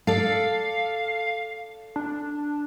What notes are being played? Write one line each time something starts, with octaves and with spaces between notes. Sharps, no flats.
A4 D5 F5
D4